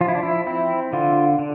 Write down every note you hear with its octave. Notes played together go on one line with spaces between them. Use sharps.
F3 F4
E4
D4
E4
C4 E4
D3 F4
D3